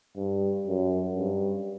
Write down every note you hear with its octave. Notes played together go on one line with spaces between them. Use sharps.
G2
F#2
G2